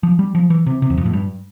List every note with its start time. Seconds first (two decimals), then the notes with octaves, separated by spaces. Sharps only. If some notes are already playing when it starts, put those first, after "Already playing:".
0.03 F3
0.19 G3
0.35 F3
0.50 E3
0.66 C3
0.82 C3
0.90 E2
0.97 F2
1.06 A2
1.13 G2